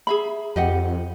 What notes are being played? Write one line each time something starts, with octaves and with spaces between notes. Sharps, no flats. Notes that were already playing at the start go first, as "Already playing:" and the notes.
G#4 E5 B5
F2 G4 D#5 F#5